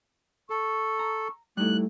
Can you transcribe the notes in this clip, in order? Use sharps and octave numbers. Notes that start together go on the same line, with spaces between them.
A4 C#6
A#5
G3 A3 D#4 E4 F#6